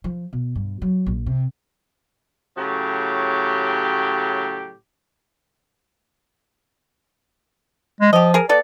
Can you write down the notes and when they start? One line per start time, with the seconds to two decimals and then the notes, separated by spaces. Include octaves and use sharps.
0.04 F3
0.33 B2
0.55 G2
0.82 F#3
1.06 A#1
1.26 C3
2.57 A2 C#3 F#3 G4
8.01 G#3
8.13 F3 G4 D#5
8.34 G#4 A#4
8.49 B3 A4 D5